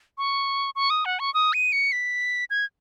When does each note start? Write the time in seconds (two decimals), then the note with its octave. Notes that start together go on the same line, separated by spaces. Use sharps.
0.18 C#6
0.76 C#6
0.90 D#6
1.05 F#5
1.19 C#6
1.34 D#6
1.53 D#7
1.72 C#7
1.92 B6
2.50 G#6